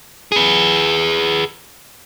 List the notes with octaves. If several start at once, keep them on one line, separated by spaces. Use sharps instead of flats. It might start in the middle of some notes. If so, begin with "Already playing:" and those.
G#4 B4